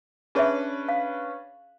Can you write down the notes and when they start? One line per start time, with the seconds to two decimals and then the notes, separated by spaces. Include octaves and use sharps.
0.35 C#4 D4 G#4 B4 C#5 E5
0.89 F5